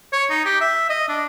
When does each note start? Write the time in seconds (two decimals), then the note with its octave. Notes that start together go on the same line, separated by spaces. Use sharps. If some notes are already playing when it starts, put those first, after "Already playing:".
0.13 C#5
0.30 D#4
0.45 G4
0.61 E5
0.90 D#5
1.09 D4